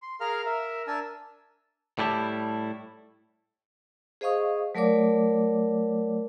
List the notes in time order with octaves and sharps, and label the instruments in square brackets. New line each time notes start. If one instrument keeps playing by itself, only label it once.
[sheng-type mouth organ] C6
G#4 A#4 F5 A#5 F6
A#4 E5
D4 A#4 G#5 A5 E6
[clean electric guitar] A2 G3 E4 G4 A5
[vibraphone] G#4 C5 D#5 F5 C#6 D#6
F#3 A3 A#4 C#5 D5 D6